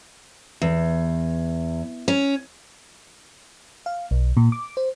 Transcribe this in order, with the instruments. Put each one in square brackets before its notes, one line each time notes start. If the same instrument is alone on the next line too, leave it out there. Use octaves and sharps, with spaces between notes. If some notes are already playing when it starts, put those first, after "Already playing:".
[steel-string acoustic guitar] E2
C#4
[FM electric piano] F5
B1
A#2
D6
C5